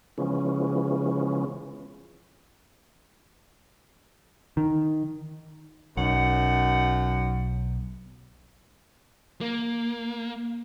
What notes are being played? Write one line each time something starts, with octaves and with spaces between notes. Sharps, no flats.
C#3 E3 F3 G#3 B3 C#4
D#3
B1 F#2 D#4 F#5
A#3